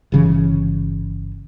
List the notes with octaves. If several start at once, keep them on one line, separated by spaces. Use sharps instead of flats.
G1 C#3 E3